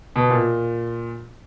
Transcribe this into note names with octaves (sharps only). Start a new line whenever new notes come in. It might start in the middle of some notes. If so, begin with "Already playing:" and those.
B2
A#2